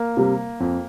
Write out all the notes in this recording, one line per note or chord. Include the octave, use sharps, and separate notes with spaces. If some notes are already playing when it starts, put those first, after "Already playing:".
Already playing: A#3
C3 G3
F2